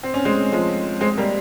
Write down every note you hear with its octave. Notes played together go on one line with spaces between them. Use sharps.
C4
C#4
G#3 C4
F3 G#3
G#3 C4
G3 A#3